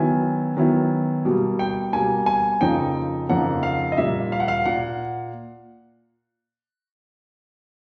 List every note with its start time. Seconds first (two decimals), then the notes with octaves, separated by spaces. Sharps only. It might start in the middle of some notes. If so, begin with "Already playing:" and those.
Already playing: D#3 F#3 B3 E4 G#5
0.57 D#3 F#3 B3 E4
1.25 B2 G3 A#3
1.59 G5
1.93 B2 G3 A#3 G#5
2.26 G#5
2.61 F2 C#3 F3 A#3 D#4 G5
3.29 F2 C#3 F3 A#3 D#4 F#5
3.63 F5
3.92 D#5
3.97 A#2 G3 A#3 E5
4.32 F5
4.40 F#5
4.48 F5
4.66 A#2 F#5